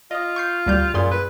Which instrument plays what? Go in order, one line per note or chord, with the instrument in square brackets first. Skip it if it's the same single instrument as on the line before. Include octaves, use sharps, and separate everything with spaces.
[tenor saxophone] F4 [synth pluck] D#5 D#6
[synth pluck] C#6 G6 C7
D2 G3 G6
[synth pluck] F#2 G#4 C6 [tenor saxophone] A#2
[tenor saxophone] B4